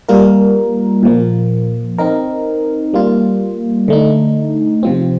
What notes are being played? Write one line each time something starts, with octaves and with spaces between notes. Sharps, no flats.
G3 A#3 F4 A#4
A#2 F3 A#3
C4 D#4 A#4
G3 A#3 F4
D3 A3 D#4
C3 F3 C4